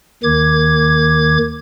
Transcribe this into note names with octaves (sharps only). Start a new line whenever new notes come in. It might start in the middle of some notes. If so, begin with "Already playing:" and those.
D#2 D#3 D6 G#6